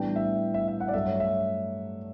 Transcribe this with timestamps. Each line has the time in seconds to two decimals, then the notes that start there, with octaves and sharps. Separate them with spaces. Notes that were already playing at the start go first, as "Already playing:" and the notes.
Already playing: A2 E3 G3 B3 D4 G5
0.16 E5
0.54 E5
0.68 E5
0.80 F#5
0.88 D5
0.94 G2 F#3 A3 E5
1.07 C#5
1.20 E5